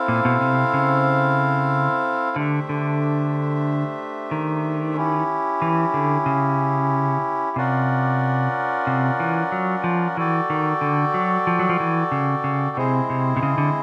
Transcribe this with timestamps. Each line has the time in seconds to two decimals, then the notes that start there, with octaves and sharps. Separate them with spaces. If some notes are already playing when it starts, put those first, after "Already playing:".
Already playing: C4 E4 A4 C5 F5
0.08 A#2
0.25 B2
0.41 C3
0.74 C#3
2.36 D3 A3 D4 G4 C5 E5
2.69 D3
4.31 D#3
4.96 C#4 E4 G4
5.62 E3
5.94 D3
6.26 C#3
7.56 C3 C#4 F4 A#4 D5 F#5
8.87 C3
9.20 E3
9.52 F#3
9.84 F3
10.17 E3 F#4 A4 D5 G5
10.50 D#3
10.81 D3
11.14 F#3
11.47 F3
11.59 F#3
11.69 F3
11.80 E3
12.12 C#3
12.44 C#3
12.77 C3 G#3 C4 E4 G#4 C5
13.10 C3
13.37 C3
13.43 C#3
13.58 D3